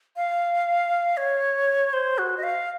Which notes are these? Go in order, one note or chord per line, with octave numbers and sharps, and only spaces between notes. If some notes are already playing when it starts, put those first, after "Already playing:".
F5
C#5
C5
F#4
D#5
F5